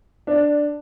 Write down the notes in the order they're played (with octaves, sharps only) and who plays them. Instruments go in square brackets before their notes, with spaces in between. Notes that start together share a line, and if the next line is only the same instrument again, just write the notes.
[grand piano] D4